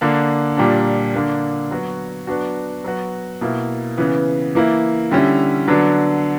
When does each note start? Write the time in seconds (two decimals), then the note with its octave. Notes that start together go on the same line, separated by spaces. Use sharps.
0.01 D3 A#3 D4
0.57 A#2 G3 A#3 D4
1.14 D3 A#3 D4
1.71 F#3 B3 F#4
2.27 F#3 B3 D4 F#4
2.84 F#3 B3 F#4
3.41 B2 A#3 E4
3.98 C#3 E3 B3
4.55 E3 A#3 E4
5.11 D3 G3 C#4 E4
5.68 D3 F#3 B3 D4